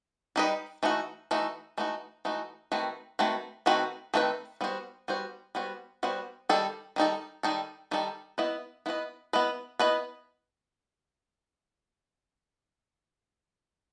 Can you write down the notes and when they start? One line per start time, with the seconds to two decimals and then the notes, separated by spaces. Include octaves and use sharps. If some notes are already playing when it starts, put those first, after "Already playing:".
0.36 G3 D#4 G4 B4 D#5
0.83 E3 A3 D#4 F#4
1.31 E3 A3 D#4 F#4
1.78 E3 A3 D#4 F#4
2.25 E3 A3 D#4 F#4
2.72 D#3 A3 C4 F#4 B4
3.19 D#3 A3 C4 F#4 B4
3.66 D#3 A3 C4 F#4 B4
4.14 D#3 A3 C4 F#4 B4
4.61 G3 B3 F#4 C5
5.08 G3 B3 F#4 C5
5.55 G3 B3 F#4 C5
6.03 G3 B3 F#4 C5
6.49 D#3 G3 D#4 A4
6.96 D#3 G3 D#4 A4
7.43 D#3 G3 D#4 A4
7.91 D#3 G3 D#4 A4
8.38 B3 E4 B4 D#5
8.86 B3 E4 B4 D#5
9.33 B3 E4 B4 D#5
9.79 B3 E4 B4 D#5